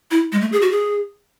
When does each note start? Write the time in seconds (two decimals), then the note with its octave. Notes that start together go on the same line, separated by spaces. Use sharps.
0.11 E4
0.32 G#3
0.41 A3
0.52 G#4
0.62 F#4
0.71 G#4